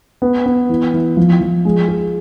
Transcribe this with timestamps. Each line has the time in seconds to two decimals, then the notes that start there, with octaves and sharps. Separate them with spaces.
0.22 B3
0.46 B3
0.69 E3
0.94 E3
1.17 F3
1.41 F3
1.65 G#3
1.88 G#4